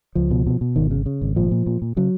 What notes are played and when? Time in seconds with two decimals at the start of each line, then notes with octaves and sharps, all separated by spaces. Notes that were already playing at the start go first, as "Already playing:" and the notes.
0.15 C#2 F3
0.31 B2
0.47 B2
0.61 B2
0.76 G#1 D#3
0.91 C#3
1.06 C#3
1.22 G#1
1.36 A#2 F3
1.51 A#2
1.67 A#2
1.82 A#2
1.97 C#3 F#3